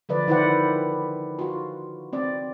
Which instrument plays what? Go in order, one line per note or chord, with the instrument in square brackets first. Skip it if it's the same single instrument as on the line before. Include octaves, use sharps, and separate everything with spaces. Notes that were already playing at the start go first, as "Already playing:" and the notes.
[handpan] D3 F3 B4 D5
D#3 E4 B4 C5 D5 F#5
F4 F#4
C4 D5